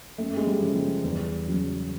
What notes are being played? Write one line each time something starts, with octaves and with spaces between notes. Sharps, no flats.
F#2 A3
G#3
G3
C#3 F3
G3
E2
C#3 F#3